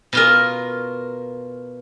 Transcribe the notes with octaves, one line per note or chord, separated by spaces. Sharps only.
B2 F4 A#4